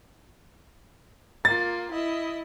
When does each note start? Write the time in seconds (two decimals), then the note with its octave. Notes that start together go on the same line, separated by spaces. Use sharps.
1.45 A#3 F4 A6
1.91 E4 D#5